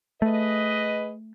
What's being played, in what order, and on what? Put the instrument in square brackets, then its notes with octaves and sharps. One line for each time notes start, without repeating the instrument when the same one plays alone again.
[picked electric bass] A3 [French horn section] G#4 B4 D#5